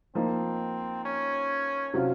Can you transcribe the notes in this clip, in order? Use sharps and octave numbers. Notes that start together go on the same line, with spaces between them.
F3 A#3 C4 D#4
C#4
C3 F#3 C#4 F4